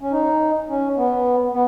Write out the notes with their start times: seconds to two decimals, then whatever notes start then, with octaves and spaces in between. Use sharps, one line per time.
0.01 C#4
0.12 D#4
0.69 C#4
0.97 B3
1.53 B3